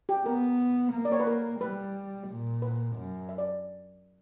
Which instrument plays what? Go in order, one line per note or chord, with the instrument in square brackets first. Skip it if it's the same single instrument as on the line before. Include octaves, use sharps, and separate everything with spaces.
[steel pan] G4
[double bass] B3 [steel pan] A#4
[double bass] A#3
[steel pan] D5
C#5
B4
A#4
[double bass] G3 [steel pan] B4
[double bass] A#2
[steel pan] B4
[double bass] F#2
[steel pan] E5
D5